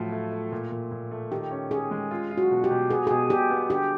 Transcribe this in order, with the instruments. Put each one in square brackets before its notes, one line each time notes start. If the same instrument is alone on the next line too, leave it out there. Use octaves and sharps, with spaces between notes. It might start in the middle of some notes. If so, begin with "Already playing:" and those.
Already playing: [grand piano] A2 F3 F#3 [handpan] F4
[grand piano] A3
A3
A#2
A#2
A#2
A3
[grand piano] D#3 [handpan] G4
[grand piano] C#4
[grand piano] C#4 [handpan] G#4
[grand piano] G#3
F4
F4
[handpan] F#4
[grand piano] B2
[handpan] G4
[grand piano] B2
[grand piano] B3 [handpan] G#4
[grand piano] B2 [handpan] G#4
[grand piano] B2 [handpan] G4
[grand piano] B3
[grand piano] D3 [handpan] G4